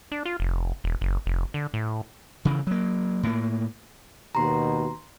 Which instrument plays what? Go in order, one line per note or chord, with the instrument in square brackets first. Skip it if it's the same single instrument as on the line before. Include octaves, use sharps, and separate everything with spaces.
[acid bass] D4
F4
F1
E1
F#1
F1
D3
A2
[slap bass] C#3 E3
F#3 A#3
A2 A#3
[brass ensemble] D#2 B2 [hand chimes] A#5 C6